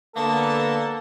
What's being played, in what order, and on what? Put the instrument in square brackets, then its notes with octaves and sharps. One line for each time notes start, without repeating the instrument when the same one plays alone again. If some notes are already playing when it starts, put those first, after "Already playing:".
[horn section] D3 B3 [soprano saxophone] A#3 [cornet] A4 [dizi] A5